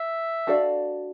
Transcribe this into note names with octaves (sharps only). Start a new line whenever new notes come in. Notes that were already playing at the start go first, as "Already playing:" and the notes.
Already playing: E5
D4 F#4 A4 D5 F5